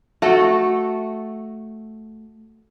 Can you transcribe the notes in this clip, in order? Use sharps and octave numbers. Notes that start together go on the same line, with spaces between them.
A3 F#4 A4